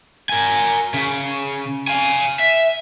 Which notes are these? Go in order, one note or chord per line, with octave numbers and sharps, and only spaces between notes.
A#4 G#5
C#3
F5 G#5
E5